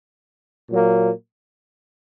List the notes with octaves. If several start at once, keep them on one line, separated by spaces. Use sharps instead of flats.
A#2 F#3 A#3